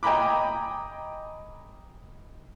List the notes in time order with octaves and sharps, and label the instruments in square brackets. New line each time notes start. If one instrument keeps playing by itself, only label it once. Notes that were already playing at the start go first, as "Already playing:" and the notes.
[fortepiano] D#5 G5 G#5 A#5 B5 D6